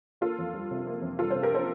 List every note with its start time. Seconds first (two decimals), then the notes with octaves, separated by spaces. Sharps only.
0.21 A#3 F4 A4
0.39 F2
0.54 G3
0.71 C3
0.87 A#3
1.02 F2
1.19 G3 F4 A4
1.31 C3 A4 C5
1.42 G4 A#4
1.51 A#3 A4 C5